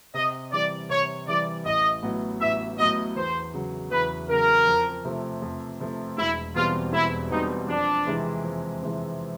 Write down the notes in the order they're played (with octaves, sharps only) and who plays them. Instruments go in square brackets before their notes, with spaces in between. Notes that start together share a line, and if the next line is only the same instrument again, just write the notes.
[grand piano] C3 [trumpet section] D#5
[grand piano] E3 G3 [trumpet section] D5
[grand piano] C3 [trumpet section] C#5
[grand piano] E3 G3 [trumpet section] D5
[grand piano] A1 [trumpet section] D#5
[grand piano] A2 F#3 B3
[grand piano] A1 [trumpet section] E5
[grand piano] A2 F#3 B3 [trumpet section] D#5
[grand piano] E2 [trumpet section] C5
[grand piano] C#3 F#3
[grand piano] E2 [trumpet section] B4
[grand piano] C#3 F#3 [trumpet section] A#4
[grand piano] F2
C3 F3 A3
F2
C3 F3 A3
[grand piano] E1 [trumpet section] E4
[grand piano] E2 B2 G3 C4 [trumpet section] F4
[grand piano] E1 [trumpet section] E4
[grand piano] E2 B2 G3 C4 [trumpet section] D#4
[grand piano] F2 [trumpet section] D4
[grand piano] C3 E3 G#3 C4
F2
C3 E3 G#3 C4